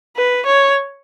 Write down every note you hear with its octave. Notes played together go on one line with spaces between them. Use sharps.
B4
C#5